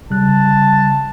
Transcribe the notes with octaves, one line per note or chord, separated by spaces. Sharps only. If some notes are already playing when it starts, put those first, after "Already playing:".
C#3 G3 A5 F#6